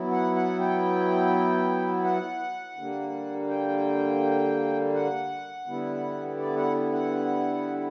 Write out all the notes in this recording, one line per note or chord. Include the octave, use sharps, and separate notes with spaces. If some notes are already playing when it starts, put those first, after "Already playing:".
Already playing: F#3 B3 E4
F#5
F#5
G5
F#5
D3 G3 A#3
G5
F#5
D3 G3 B3 E4
D5
F#5
F#5